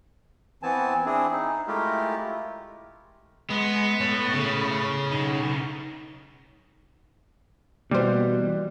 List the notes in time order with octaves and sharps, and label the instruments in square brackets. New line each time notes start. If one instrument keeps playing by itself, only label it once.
[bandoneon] E3 B3 C4 G#5 A5
C4 D4 E4 G#4
D#4
G#3 A3 E4 F4 G4 A#4
[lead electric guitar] G#3 [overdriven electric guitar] B3
[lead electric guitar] A2 C#5
[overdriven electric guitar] C#3
[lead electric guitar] B1 D#4
[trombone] B2 [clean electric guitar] E3 [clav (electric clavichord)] G3 [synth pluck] A#3 C5